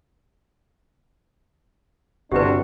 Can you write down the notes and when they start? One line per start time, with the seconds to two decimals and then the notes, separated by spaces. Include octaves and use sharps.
2.32 G1 C3 D4 F#4 G4 B4